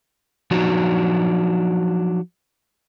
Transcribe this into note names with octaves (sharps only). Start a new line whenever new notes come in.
F3 F#3 D4 D#4 F#4